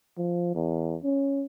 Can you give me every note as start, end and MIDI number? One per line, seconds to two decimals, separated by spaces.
0.18 0.52 53
0.55 0.97 40
1.04 1.45 61